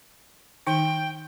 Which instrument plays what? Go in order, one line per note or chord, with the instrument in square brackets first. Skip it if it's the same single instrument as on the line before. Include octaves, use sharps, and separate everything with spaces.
[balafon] D#3 D#4 [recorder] G5